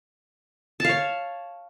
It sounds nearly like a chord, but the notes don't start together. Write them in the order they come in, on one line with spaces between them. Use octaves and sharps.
A5 F5 C#5